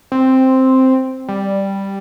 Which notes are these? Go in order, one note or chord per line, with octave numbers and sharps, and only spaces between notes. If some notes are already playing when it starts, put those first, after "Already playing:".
C4
G3